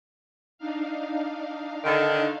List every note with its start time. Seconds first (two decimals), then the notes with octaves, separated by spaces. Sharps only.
0.58 D4 D#4 F5
1.84 D3 D#3